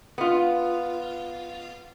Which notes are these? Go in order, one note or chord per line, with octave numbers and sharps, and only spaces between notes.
B3 F4